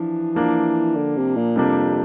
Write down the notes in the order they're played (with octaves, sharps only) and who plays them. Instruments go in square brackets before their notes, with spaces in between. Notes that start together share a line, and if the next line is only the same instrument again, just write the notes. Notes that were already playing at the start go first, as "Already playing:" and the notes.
Already playing: [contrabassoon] E3 [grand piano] F3 D4
[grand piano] F3 A#3 D4
[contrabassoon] D3
C3
A#2
[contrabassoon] F2 [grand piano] C3 G3 A#3 D4